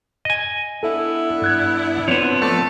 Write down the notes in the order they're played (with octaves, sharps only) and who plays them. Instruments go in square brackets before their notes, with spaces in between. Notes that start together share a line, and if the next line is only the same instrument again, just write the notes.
[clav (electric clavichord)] D#5 G#5
[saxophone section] B3 D4 E4 [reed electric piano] A4 E5
[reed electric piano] G2 F#6 G#6
[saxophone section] D3 D4 [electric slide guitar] F3 B3 [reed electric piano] C4 [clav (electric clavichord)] C#5
[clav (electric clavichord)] A3 [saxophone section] A4 D5